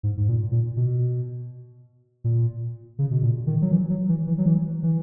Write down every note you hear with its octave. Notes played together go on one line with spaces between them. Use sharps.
G#2
G#2
A#2
A#2
B2
A#2
C#3
B2
A#2
D#3
F#3
E3
F#3
E3
E3
F#3
E3
E3